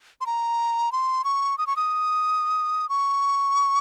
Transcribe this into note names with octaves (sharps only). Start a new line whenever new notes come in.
C6
A#5
C6
C#6
D#6
C#6
D#6
C#6